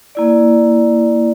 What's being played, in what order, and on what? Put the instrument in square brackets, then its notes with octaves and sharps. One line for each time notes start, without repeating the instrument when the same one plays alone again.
[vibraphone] A#3 E4 D5